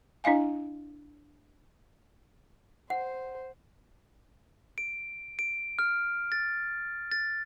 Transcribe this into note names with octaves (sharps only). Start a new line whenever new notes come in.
D4 E4 D#5 F5 G#5
C5 F#5
D7
D7
F6
A6
A6